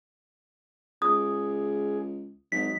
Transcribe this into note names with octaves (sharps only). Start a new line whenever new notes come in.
C#2 G#4 D#6
G#1 F#3 D#4 B6